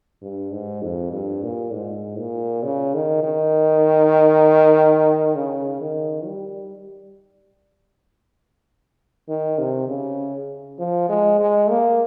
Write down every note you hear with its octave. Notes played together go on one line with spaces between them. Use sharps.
G2
G#2
F2
G2
A#2
G#2
A#2
C#3
D#3
D#3
C#3
D#3
G3
D#3
C3
C#3
F3
G#3
G#3
A#3